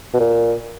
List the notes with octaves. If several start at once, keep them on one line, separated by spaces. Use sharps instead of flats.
B2
A#2